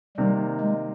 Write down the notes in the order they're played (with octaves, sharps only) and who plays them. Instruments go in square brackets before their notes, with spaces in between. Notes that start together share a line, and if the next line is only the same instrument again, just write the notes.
[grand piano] C3 D#3 A#3 [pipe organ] G3
[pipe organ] G#3